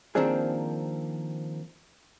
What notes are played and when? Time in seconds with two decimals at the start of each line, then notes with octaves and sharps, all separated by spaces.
0.15 D#3 F3 A#3 C4 D4 G#4